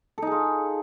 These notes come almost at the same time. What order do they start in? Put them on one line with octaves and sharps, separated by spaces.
A4 D#4 G#4 F4